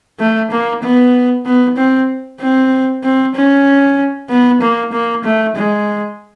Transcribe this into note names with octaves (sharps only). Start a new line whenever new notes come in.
A3
A#3
B3
B3
C4
C4
C4
C#4
B3
A#3
A#3
A3
G#3